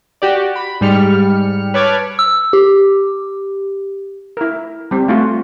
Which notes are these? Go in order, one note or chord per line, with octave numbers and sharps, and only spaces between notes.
F#4 G4 D5
B5
G#2 G3 F6 C#7
B4 C#5 A5 D6 F6 G#6
E6
G4
E4 A#4
G3 C4
A3 F4 F#4